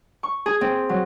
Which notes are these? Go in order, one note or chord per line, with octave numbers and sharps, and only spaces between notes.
C#6
G#4
C4
F#3